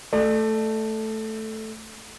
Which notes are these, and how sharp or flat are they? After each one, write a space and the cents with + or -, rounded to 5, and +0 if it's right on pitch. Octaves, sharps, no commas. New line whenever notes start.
A3 +0 D5 +35